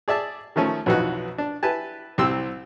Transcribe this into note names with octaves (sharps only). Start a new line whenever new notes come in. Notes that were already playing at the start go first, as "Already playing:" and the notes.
G#4 D5 E5 A5
D#3 F3 A3 C#4
B1 F2 B2 E3 D#4 F#4
D4
E4 G4 B4 G#5 A5
C2 C3 C4 C6 E6